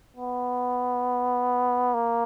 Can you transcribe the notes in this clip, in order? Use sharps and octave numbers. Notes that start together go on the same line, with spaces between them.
B3
A#3